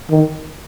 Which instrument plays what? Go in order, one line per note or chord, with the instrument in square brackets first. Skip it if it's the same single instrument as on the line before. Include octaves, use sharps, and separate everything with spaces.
[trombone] D#3